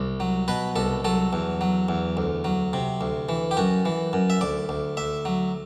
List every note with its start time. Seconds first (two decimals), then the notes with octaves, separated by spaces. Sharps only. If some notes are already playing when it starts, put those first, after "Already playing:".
Already playing: C2
0.20 F#3
0.48 B2 B4
0.76 C2 A4
1.05 F#3 A4
1.33 E2
1.61 F#3
1.89 E2
2.17 D2
2.44 F#3
2.73 C3
3.01 D2
3.29 E3
3.51 G4
3.57 F#2 F#4
3.85 E3
4.13 F#2
4.30 E5
4.41 D2 D5
4.69 D2
4.97 D2 E5
5.25 F#3